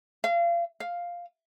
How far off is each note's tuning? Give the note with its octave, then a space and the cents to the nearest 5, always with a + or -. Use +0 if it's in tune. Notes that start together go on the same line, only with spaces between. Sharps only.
F5 -30
F5 +0